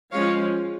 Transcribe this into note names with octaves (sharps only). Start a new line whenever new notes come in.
F3 G#3 C#4 C#5 F5